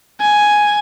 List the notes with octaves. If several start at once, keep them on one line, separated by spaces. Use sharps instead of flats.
G#5